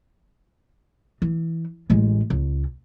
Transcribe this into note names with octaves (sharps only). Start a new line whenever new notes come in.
E3
A1 G#3
C#2